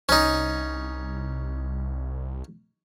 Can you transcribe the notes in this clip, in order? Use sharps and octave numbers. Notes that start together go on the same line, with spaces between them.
C2 C#4 D#4